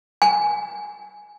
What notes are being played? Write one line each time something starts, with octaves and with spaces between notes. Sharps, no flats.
G#5